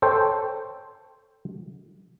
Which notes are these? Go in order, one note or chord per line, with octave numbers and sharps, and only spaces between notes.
A4 C5 C#5 G5 A5